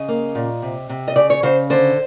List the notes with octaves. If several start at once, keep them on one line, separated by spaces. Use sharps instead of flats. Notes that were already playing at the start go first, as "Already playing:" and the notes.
Already playing: C#3 D#5
A#3
A#2
C3
C3
D#5
C#3 D5
C#5
C#3 C5
D3 C5